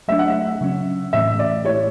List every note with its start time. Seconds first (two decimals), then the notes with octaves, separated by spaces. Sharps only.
0.08 F#3 A3 D4 E5
0.19 F#5
0.30 E5
0.61 C#3 F#3 C#4
1.13 A2 E3 A3 C#4 E5
1.39 D5
1.65 A3 E4 G4 C#5